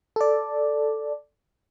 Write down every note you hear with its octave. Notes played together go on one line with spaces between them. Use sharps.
A4 D5